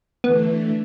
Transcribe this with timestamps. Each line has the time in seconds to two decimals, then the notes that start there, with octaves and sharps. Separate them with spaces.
0.24 D3 E3 A3 B3